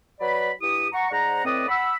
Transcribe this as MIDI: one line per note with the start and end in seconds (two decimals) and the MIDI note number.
0.20 0.51 54
0.20 0.51 71
0.20 0.51 74
0.20 0.51 83
0.61 0.87 43
0.61 0.87 64
0.61 0.87 67
0.61 0.87 87
0.93 1.07 78
0.93 1.07 82
0.93 1.07 85
1.11 1.44 44
1.11 1.44 72
1.11 1.44 74
1.11 1.44 78
1.11 1.44 82
1.44 1.64 45
1.44 1.64 60
1.44 1.64 71
1.44 1.64 74
1.44 1.64 75
1.44 1.64 87
1.68 1.95 78
1.68 1.95 83
1.68 1.95 88